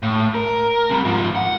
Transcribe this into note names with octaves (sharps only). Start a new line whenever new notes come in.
A2
A#4
C3 G3
G#2 F3
F#5